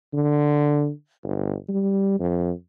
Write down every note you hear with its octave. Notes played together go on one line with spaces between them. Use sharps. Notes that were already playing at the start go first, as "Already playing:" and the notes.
D3
G1
G3
F2